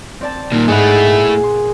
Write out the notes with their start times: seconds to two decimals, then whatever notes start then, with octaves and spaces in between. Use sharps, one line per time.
0.21 C4 D5 A5
0.52 A#2 D#3
0.68 G#2 A3 B3 E4 G#4 F#5
1.06 A#2
1.43 C6